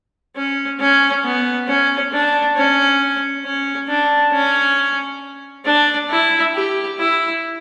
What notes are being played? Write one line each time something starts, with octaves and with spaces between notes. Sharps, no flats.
C#4
C#4
B3
C#4
D4
C#4
C#4
D4
C#4
D4
E4
G4
E4